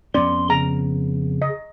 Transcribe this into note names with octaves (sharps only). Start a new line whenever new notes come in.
F2 B3 C#4 D5 C6
C#3 A#5
D#5